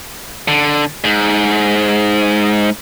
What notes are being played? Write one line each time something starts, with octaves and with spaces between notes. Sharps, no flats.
D3
G#2